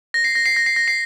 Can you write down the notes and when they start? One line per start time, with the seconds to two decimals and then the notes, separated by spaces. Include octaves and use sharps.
0.14 A#6
0.24 C7
0.35 A#6
0.46 C7
0.56 A#6
0.66 C7
0.76 A#6
0.88 C7